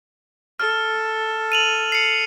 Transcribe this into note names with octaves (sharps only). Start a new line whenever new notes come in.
A4 F6
D#7 F7 F#7
C7 C#7